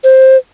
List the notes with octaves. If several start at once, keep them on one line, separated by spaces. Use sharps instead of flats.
C5